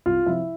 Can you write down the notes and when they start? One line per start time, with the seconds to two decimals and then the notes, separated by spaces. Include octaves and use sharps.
0.06 C2 F4 F5
0.26 C3 F3 E4 E5